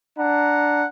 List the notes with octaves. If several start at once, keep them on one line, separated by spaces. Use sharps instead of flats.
D4 F#5 A#5